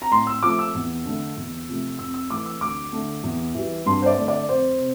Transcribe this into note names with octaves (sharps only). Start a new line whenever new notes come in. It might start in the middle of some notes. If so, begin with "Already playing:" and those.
A#5
A2 C6
E6
F3 A3 D6
E6
E2
D3 A3
E2
C3 F3 A3
F2 E6
E6
E3 A3 D6
E6
D2 D6
D3 A3
E2
E3 G3
G2 C6
C5
D5
D3 A3
D5
F2 C5
C3